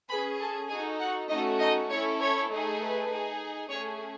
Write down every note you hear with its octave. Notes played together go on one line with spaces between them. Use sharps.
C#4 G#4 B4 B5
A4 A5
D#4 F#4 G#4 A4 G#5
F#4 F#5
A3 C#4 D#4 F#4 A4 D#5
D#4 D#5
C#4 E4 A4 C#5
C#5
A3 D#4 G#4
B4
D#4 G#4
A3 C#4 G#4 C#5